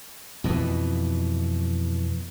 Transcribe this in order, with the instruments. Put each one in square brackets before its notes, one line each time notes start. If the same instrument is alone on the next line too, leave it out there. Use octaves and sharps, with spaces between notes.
[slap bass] F2 B2 E3